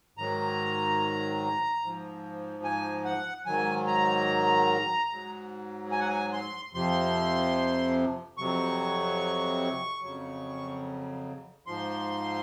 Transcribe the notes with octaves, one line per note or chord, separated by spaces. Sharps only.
G#2 D#3 F#3 A#5
G#2 F3
G#5
F#5
G#2 D#3 F#3 G#5
A#5
G#2 F#3
G#5
F#5
G#5
C6
F2 C3 F3 C6
F2 C3 F#3 C#6
F2 C#3 F#3
G#2 F3 C6